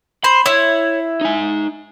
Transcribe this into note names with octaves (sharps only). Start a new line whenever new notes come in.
C5 B5
E4 C#5
D#4 G#5